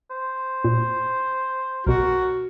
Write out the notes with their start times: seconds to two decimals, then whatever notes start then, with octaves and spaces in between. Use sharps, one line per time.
0.11 C5
0.64 A#2
1.87 B1 B2 F#4 A#4